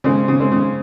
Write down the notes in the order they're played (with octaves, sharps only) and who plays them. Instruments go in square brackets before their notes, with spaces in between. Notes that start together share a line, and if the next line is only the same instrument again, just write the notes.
[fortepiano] C#3 [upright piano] G#3 C4
[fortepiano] C#3
[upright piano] G#3 C4
[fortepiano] C#3